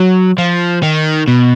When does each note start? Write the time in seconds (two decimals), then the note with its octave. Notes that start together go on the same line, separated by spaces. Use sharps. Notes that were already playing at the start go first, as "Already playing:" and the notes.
Already playing: F#3
0.38 F3
0.83 D#3
1.28 B2